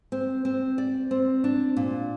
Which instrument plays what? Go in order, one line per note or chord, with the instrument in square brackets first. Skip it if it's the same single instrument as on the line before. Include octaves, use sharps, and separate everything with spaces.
[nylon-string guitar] C4
C4
D5
C4
D4
A#2